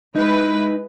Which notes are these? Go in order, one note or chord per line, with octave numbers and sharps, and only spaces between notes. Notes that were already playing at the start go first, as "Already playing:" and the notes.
G#3 D#4 E4 B4